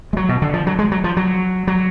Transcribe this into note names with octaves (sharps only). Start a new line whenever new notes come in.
G#3
F#3
B2
D3
F3
F#3
G#3
F#3
F3
F#3
F#3